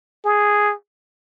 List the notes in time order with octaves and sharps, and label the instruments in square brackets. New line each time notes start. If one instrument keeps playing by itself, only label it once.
[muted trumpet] G#4